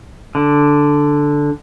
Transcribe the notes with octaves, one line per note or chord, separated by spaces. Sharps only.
D3